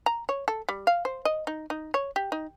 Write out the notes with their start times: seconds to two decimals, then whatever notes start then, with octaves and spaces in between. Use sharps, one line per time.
0.06 A#5
0.29 C#5
0.48 A4
0.69 G3
0.87 F5
1.05 C5
1.25 D#5
1.47 D#4
1.70 D#4
1.94 C#5
2.16 G4
2.32 D#4